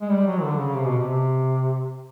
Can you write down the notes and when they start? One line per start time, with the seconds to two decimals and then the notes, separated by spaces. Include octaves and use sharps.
0.01 G#3
0.10 G3
0.27 F#3
0.42 D3
0.58 C#3
0.74 C3
0.86 B2
0.99 C3